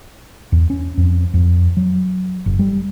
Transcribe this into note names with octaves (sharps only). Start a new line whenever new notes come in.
E2
C#4
F2
F2
F#3
F#1
G3